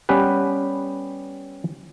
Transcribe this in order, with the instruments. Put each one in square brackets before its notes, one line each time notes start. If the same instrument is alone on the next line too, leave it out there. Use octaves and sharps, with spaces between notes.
[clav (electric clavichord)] G3 B3 C#4 G4 B4